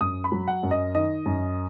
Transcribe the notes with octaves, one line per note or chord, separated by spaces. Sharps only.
F#2 D#6
B5
F#3
F#5
F#2
D#5
D#3 D#5
F#2